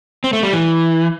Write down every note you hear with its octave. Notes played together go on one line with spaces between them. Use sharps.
C4
A3
G3
E3